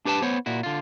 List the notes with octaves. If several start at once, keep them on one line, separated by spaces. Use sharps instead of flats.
D4 G4 B4 G#5 A5
B3 C5 C#5
A#2 E4 F#4
D3 F4